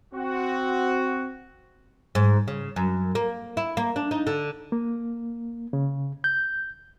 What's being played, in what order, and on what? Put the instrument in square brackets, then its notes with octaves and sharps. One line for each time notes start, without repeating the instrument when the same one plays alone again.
[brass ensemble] C4 F#4
[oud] G#2
C#3
F#2
A#3
E4
A#3
D4
D#4
D3
[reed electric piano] A#3
C#3
G6